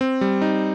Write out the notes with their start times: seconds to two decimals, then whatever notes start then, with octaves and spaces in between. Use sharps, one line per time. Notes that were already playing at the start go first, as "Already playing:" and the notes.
0.01 C4
0.21 G3
0.41 D#4